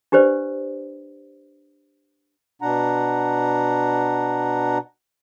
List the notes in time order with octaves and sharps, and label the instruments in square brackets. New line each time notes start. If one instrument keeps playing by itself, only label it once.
[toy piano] D4 G4 B4 C5 D5
[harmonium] B2 D4 F#5 A#5